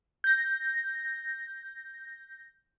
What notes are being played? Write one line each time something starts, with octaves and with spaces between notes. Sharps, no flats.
G6 A#6